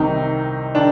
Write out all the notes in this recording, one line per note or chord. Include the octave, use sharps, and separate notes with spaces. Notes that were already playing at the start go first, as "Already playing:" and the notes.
Already playing: C2 C3 D#3 D#4
D#3 D4